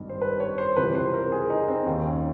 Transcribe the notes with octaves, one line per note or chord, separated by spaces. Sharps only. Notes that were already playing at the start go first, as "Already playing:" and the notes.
Already playing: G#1 G2 D#3
C5
B4
C#5
C5
C#2 C3 E3 B4
C5
A#4
G#4
D#4
C4
D#2 D#3
C#4